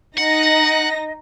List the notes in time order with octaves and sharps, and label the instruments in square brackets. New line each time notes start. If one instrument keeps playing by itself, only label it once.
[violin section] D#4 A#6 [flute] D#5 [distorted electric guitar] F#5